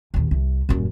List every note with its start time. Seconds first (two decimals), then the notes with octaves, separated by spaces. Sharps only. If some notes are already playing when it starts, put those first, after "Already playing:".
0.14 A#1 D#2
0.31 C2
0.69 D#1 F#2